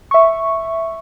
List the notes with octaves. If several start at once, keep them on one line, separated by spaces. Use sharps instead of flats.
E5 C#6